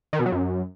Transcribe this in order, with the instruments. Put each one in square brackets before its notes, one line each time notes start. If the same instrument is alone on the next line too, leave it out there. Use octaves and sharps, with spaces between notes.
[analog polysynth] D#3
B2
F#3
F#2